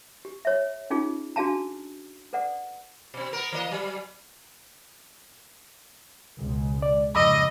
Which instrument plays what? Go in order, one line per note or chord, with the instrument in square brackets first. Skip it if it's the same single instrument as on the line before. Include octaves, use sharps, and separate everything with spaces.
[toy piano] G4
C#5 E5
C#4 D#4 F4 G#4
D4 F#4 G#4 F5 A5 A#5
A4 B4 D5 F#5
[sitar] B2 C4
B3 A#4
E3 A#3 D#5
F#3
[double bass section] C#2 B2 G#3
[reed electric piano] D5
[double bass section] F2 G#2 C#3 [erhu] D#5 [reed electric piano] B5 D6 E6